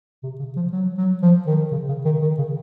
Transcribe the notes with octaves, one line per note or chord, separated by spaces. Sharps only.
C3
C#3
F3
F#3
F#3
F3
D#3
C#3
C#3
D#3
D#3
C#3